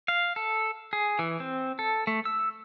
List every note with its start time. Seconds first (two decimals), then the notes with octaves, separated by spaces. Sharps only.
0.08 F5
0.36 A4
0.93 G#4
1.19 E3
1.40 C4
1.79 A4
2.07 A3
2.25 E6